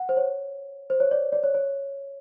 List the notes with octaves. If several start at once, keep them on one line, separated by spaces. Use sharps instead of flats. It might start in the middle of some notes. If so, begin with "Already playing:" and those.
Already playing: F#5
C5
C#5
C5
C#5
D5
D5
C#5
C#5